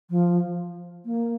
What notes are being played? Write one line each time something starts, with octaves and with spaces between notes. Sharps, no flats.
F3
A#3